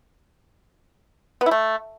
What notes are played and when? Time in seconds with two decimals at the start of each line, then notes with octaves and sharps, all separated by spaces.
1.41 B3
1.46 E4
1.51 A3